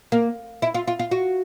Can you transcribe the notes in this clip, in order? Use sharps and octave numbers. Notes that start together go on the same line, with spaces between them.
A#3
E4
F4
F4
F4
F#4